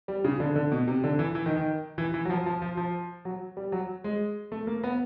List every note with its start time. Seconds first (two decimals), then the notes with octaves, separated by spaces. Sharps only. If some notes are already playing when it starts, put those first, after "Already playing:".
0.08 G3
0.24 C#3
0.40 D3
0.56 D3
0.72 B2
0.88 C3
1.04 D3
1.19 E3
1.35 E3
1.46 D#3
1.56 D#3
1.98 E3
2.14 E3
2.25 F#3
2.30 F3
2.46 F3
2.62 F3
2.77 F3
3.25 F#3
3.57 G3
3.72 F#3
4.04 G#3
4.52 A3
4.67 A#3
4.84 B3